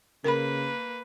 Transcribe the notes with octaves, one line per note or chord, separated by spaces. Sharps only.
C#3 A#3 A#4 B4 B5